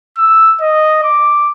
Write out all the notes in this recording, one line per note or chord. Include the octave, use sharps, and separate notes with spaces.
E6
D#5
D6